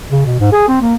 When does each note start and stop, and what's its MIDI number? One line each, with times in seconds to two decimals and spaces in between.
0.11 0.23 49
0.26 0.39 47
0.40 0.50 44
0.52 0.66 68
0.68 0.79 60
0.81 0.95 58